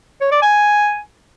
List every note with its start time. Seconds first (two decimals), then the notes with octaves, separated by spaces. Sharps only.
0.21 C#5
0.32 D5
0.42 G#5